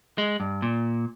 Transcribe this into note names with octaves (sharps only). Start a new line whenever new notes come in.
G#3
G2
A#2